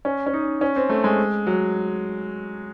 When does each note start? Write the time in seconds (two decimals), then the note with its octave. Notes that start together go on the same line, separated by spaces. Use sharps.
0.05 C#4
0.26 C#4
0.33 D#4
0.61 C#4
0.76 C4
0.89 A3
1.04 G#3
1.47 F#3